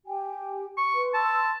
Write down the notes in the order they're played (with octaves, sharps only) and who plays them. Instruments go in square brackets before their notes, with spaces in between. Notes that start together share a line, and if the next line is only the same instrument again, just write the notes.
[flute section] G4 G5 G#5
[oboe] C#6
[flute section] B4 C6
[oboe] A5 [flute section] C6 E6